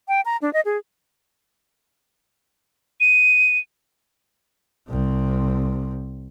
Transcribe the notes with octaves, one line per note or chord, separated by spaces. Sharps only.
G5
A#5
D4
D#5
G#4
D#7
C2 C3